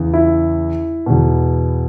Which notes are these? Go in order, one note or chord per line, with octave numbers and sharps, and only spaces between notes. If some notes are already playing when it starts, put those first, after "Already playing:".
Already playing: E2 C#3 E3
E4
E2 B2